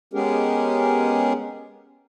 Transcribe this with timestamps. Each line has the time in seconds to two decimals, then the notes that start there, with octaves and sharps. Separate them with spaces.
0.13 G#3 B3 C#4 G4 G#4 A#4